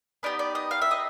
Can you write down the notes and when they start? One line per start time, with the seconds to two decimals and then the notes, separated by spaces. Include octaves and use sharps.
0.23 B3 D#4 G4 D5
0.39 D5
0.55 D#5
0.71 F5
0.82 E5
0.91 D#5